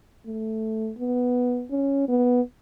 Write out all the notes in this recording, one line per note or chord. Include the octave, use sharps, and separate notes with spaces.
A3
B3
C#4
B3